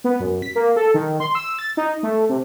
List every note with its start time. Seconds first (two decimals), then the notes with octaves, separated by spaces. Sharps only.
0.04 B3
0.20 F#2
0.42 B6
0.55 A#3
0.76 A4
0.94 D#3
1.20 C6
1.35 E6
1.59 A6
1.77 D#4
2.03 A3
2.29 C3